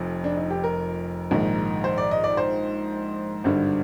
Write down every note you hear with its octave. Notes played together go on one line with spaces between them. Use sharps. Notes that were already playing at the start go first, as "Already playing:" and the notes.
Already playing: F1 F2
D4
D#4
G4
A#4
A#1 G#2 D#3
C5
D5
D#5
D5
C5
G#1 G2 D3